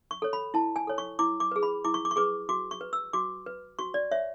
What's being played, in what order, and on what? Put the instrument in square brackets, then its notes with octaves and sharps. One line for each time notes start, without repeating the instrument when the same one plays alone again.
[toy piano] C#6
A4 C#5
B5
E4 A5
G#5
A4 C#5
C#6
E4 D6
D6
G#4 B4
B5
E4 D6
C#6
D6
C#6
G#4 B4 D6
F#4 D6
C#6
B4
E6
F#4 D6
B4
F#4 C#6
D5
C#5 E5